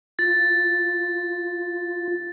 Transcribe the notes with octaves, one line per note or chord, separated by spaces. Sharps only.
F4 A6